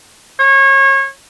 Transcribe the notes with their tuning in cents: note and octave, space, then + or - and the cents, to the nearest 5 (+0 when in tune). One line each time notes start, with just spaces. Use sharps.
C#5 -30